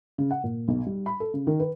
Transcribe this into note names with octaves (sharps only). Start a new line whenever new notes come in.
C#3
F#5
A#2
B1
G3
B5
A4
C#3
D#3
B4